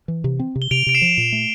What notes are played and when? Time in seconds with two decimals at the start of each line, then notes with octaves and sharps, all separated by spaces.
0.08 E3
0.24 C3
0.39 C4
0.56 C3
0.62 G7
0.71 C3 D7 F7
0.87 C3 D7
0.95 C7 E7
1.02 F3
1.17 A#2
1.32 A3